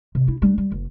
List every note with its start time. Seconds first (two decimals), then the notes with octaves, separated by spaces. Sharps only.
0.15 C3
0.27 D4 E4
0.42 G3 D4
0.58 G3
0.72 F#1